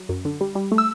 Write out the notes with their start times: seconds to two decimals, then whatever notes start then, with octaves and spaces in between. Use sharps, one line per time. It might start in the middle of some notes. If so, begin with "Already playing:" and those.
Already playing: F#3
0.09 F#2
0.25 D3
0.41 G3
0.55 G3
0.72 A3
0.78 E6